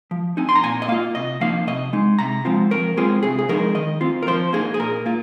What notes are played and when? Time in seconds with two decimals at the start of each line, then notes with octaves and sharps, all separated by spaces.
0.11 F3
0.37 C4 D#4 G#5
0.49 C6
0.56 A#5
0.63 A#2 G#5
0.82 D#5
0.88 A#3 F4 F5
1.15 C3 D#5
1.41 F3 A#3 D#4 F5
1.67 C3 D#5
1.93 G#3 D#4
2.19 C3 A#5
2.45 F3 G#3 C4 F4
2.71 F3 A#4
2.97 G#3 C4 F4 G#4
3.23 C3 G#4
3.39 G#4
3.49 F3 G#3 D#4 A#4
3.75 D#3 D#5
4.01 C4 F4
4.23 A#4
4.27 F3 C5
4.53 A#3 D#4 G#4
4.74 G#4
4.79 A#2 A#4
5.06 A#3 F4